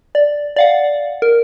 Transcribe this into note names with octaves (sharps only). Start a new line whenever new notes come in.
D5
D5 F5 F#5
A#4